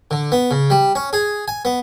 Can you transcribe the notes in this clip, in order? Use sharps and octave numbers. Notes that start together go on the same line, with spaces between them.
D3
B3
C#3
G3
C#4
G#4
G#5
B3